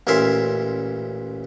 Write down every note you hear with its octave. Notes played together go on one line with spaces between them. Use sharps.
A1 A#2 C#4 A#4 E5 C6